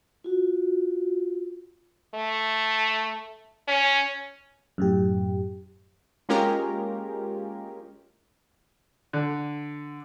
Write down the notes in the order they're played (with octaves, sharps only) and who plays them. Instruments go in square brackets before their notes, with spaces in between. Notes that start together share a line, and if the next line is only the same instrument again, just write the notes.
[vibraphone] F4 F#4
[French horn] A3
C#4
[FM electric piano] F#2 A2 G4
[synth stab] G#3 A#3 C#4 F4 G4 A#4
[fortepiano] D3